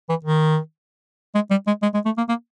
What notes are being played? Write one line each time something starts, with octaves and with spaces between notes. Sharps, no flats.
E3
D#3
G#3
G3
G#3
G#3
G#3
A3
A#3
A#3